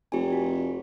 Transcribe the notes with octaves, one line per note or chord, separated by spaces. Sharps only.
F1 G4 G#5
F#4